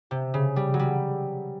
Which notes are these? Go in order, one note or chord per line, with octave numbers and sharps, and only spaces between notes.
C3
C#3
G3
F#3
G3